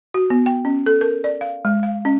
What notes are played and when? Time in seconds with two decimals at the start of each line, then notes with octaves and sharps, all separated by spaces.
0.14 F#4
0.30 B3
0.46 G5
0.65 C#4
0.86 A4
1.01 A#4
1.24 D5
1.41 F5
1.65 G#3
1.83 F5
2.05 C#4